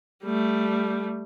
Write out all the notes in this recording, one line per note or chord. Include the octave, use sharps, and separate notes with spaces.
G3 A3